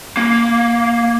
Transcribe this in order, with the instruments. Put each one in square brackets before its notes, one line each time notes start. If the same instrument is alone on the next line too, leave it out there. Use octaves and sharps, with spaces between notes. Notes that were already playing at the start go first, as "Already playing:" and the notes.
[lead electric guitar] A#3